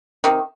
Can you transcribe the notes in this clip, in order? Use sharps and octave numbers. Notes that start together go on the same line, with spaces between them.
C3 D#3